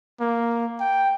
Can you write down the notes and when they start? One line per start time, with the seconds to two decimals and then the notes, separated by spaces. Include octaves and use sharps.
0.20 A#3
0.80 G5